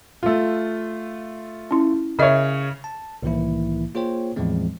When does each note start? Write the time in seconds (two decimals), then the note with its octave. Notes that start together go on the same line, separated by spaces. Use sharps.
0.23 A3 F4
1.71 C#4 E4
2.19 C#3 A#4 C#5 D#5 E5
2.84 A5
3.22 C2 A2 D#3 E3 A#3 E4
3.94 A#3 F4 G#4 C5 C#5 G5
4.36 E2 A2 E3 F3 G#3 C4